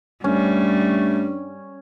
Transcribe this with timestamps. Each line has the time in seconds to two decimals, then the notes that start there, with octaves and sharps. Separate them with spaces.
0.24 G2 G3 A3 C#4